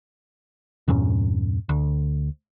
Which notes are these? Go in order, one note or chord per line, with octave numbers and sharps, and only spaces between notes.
E2 G2 A#2 C#4
D2